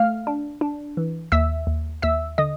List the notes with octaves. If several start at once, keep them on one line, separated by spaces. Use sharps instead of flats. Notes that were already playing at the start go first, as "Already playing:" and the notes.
Already playing: A3 F5 F6
D4
D4
E3
D#2 E5 E6
D#2
D#2 E5 E6
D3 D#5 D#6